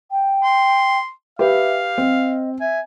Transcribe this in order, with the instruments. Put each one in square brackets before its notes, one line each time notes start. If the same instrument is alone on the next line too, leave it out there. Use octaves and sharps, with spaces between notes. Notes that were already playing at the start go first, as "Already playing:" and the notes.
[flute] G5
[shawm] C6
[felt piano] G4 B4 [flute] E5 [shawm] F5
[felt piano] C4 [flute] D#5
[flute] E5 [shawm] G#5